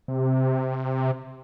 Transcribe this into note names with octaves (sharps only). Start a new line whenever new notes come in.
C3